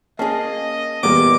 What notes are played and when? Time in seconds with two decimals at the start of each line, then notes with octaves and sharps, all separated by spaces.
0.19 A#3 C#4 G#4 D#5 A5
1.03 E2 A#2 G3 A#3 B3 D6